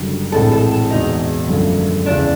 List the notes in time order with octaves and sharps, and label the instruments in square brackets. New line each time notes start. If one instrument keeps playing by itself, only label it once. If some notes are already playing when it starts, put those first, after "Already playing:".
Already playing: [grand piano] F#1 F#2 D3 G3
[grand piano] A#1 A2 E3 G#3 C4 [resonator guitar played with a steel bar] A4
[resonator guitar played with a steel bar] A4
A4
[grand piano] E2 B2 G#3 [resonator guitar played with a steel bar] D#4
[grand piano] G1 F#2 D3 F3 A3
[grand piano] E2 C#3 E3 G#3 [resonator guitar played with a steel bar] D4